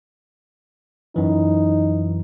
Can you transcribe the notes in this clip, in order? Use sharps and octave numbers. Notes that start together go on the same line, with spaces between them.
F#2 E3 D#4